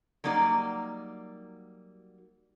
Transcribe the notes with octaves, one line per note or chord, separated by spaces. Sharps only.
F#3 G3 A#3 D#4 D5